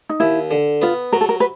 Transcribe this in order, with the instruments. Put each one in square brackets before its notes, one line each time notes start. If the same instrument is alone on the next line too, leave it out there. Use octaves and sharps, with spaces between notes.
[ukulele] D#4
[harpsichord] D#2 [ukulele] E4
[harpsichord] D3
[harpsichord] B3 [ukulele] F4
[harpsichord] F#3 [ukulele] A#4
[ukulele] A4
A#4
B4